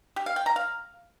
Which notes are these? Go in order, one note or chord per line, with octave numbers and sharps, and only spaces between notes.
G4
F5
G5
A#5
F5